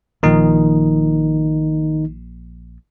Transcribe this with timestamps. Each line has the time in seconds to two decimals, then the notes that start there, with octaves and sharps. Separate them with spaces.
0.23 A#1 A#2 D#3 F3 D#4